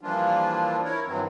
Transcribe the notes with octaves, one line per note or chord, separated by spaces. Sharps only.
E3 F3 G3 A#3 D4 F4
E4 A#4 C#5
G2 D#3 E3 F#3 C4